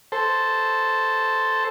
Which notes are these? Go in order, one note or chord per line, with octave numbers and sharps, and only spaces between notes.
A4 C5